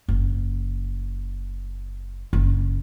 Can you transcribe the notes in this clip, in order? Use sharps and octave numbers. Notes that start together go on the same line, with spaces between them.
F#1
F#1